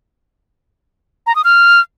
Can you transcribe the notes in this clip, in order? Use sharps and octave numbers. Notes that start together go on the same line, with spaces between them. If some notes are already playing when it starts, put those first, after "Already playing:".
A#5
D#6
F6